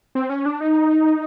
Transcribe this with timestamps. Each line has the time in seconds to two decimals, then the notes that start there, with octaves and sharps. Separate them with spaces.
0.15 C4
0.30 C#4
0.46 D4
0.61 D#4